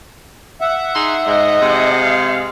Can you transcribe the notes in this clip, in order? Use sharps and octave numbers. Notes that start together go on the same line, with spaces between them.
E5 F#5
D#4 G#4 C6
G#2 D#5
C3 G#3
F5